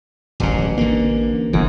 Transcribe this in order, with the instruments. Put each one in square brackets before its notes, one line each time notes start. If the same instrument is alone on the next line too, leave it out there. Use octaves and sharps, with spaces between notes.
[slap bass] D1 C#3 [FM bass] A1
[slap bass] D3 A#3
[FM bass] G1 [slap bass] E3